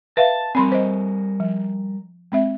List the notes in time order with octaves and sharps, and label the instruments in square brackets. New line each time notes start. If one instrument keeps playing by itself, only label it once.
[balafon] B4 E5 F5 [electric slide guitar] A5
[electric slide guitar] G3 A#4 G#5 [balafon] C4 B5 C6
[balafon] C5 D#5
F3
G#3 C4 E5